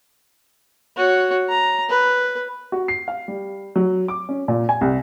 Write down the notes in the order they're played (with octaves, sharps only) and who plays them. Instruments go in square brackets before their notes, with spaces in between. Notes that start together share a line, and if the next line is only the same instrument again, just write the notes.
[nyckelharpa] F#4 C#5
A#5
B4
[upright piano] F#4
C7
F5
G3
F#3
D6
C#4
A#2
G#5
C2